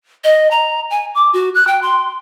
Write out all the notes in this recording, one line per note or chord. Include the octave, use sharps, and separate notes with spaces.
D#5
A#5
G#5
D6
F#4
F#6
G5
C6